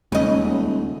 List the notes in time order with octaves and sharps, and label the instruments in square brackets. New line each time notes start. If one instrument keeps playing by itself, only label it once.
[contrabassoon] D#1 [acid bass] E2 [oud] C#3 D#5 [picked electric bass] G#3 A3